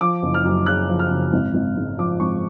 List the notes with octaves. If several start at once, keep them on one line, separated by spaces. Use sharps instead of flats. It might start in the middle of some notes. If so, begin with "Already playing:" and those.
F3 D6
F#1
F6
F#2
C#3 F#6
F3
F6
F#1
G#1
G#1
G#2
F3 D6
G#1 C#6